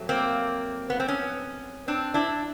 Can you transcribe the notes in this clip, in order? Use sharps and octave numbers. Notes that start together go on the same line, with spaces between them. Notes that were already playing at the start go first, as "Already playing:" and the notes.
Already playing: F2 F#3 A3
A#3 C4
B3
C4
B3 C#4
C4 D4
D4 E4